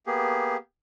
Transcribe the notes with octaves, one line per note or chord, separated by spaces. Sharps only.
A#3 B3 G4 G#4